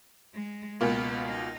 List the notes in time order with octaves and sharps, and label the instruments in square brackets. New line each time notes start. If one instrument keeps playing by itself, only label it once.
[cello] G#3
[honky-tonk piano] C#2 B2 A#3 F4 [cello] B3
[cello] D#4